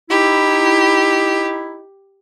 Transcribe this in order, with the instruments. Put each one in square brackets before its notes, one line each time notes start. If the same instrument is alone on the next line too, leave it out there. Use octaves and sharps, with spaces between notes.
[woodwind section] D#4 E4 [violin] G4